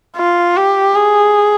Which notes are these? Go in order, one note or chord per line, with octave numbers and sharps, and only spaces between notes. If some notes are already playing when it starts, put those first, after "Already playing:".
F4
G4
G#4